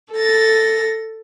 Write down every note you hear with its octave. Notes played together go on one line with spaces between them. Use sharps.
A4 A6 A#6